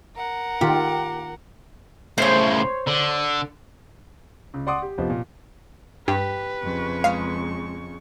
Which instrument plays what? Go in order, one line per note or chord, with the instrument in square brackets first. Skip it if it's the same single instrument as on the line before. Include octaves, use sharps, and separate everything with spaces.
[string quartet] A#4 F#5
[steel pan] D#3 F4 [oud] G4
[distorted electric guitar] A2 C#3 [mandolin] C5 C#5
[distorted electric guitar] D3
[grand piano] C#2
D5 F#5 C6 D6 D#6
G4
F1 F3 B3 G4 D#5
A#2
[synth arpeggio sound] G2 [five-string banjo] G4 [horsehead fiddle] B4
[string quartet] F2 C#3 C#6
[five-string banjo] G#3 [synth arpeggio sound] F5